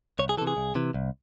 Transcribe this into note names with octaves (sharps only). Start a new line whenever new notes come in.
C2 C#5
G#4
C3 E3 A4
G#4
C2
C3 E3
C2